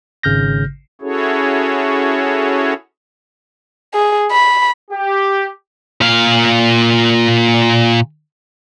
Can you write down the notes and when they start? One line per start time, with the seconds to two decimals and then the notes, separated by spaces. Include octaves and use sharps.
0.23 G#1 C#3 F6 G6 A#6
1.01 C#4 E4 F#4 G#4 A4 C#5
3.94 G#4
4.31 B5
4.91 G4
6.01 A#2 F5